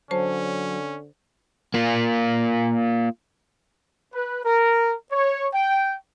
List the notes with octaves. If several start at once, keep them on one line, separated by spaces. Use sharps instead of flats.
D3 F#3 C#4 C5 A5
A#3 F4
B4
A#4
C#5
G5